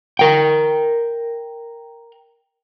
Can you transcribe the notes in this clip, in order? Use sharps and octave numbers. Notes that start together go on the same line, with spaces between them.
A#4 G5